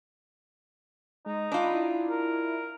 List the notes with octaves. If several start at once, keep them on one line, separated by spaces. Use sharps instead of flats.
G#3 D#4
D4 F4 B5
E4
A#4